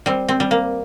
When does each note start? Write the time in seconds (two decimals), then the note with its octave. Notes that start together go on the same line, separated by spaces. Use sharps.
0.06 G3 C4
0.28 C4
0.40 G3
0.51 A#3